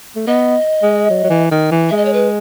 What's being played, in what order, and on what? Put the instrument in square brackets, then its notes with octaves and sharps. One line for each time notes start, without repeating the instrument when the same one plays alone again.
[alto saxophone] A3
[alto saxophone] B3 [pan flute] D#5
[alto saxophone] G#3
F#3
F#3
E3
D#3
E3
[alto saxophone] G#3 [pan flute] E5
[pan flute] D#5
C#5
B4